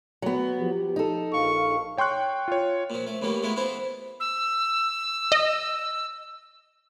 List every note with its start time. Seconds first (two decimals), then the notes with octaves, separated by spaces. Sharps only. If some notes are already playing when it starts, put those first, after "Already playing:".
0.22 F#3 B3
0.59 F3 G4
0.96 D#4 A4
1.33 A#1 F5 C#6
1.98 C#5 G5 C6 C#6 F#6
2.48 F4 C#5
2.90 A#2 F3
3.07 A3
3.22 D#2 A2 E3 G3 A#3
3.43 G#3 A3 B3 E4 F4
3.56 E3 B3 E4 A4 C5
4.20 E6
5.32 D#5